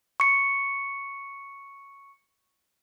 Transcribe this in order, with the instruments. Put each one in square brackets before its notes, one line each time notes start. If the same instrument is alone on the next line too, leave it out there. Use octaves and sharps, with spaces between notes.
[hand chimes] C#6 C#7